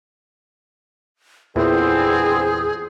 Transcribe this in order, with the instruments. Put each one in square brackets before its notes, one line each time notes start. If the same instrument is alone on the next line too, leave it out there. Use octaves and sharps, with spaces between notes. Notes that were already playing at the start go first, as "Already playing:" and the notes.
[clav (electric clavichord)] E2 A#2 E3 [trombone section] D3 B3 C4 [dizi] G#4